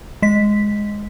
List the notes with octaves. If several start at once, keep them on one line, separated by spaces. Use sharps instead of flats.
G#3 B6